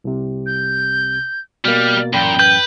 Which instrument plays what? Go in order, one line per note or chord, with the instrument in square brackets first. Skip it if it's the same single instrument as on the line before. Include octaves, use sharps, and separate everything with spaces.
[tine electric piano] C2 C3
[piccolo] G6
[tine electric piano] B2 A#3 [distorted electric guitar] G3 [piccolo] F6
[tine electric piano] A1 F#2 B5 [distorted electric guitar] A#2 [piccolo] G5
[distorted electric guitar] B4 [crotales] G6